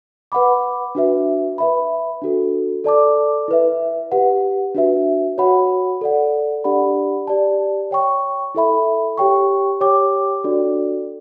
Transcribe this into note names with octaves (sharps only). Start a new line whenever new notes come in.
B4 F#5 B5 D6
D4 F#4 B4 E5
B4 E5 B5
D4 F#4 A4
A4 D5 A5 D6
E4 B4 E5
G4 B4 F#5
D4 F#4 B4 E5
F#4 C#5 F#5 B5
A4 D5 F#5
D4 G4 D5 F#5 B5
G4 D5 A5
C#5 G5 C#6
E4 A4 E5 B5
G4 C#5 G5 C#6
G4 C#5 G5 D6
D4 F#4 A4 D5